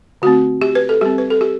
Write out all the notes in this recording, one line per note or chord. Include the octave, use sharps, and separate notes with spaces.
D3 A3 C4 F#4
G4
B4
A4
G3 C4 G4
B4
A4
G4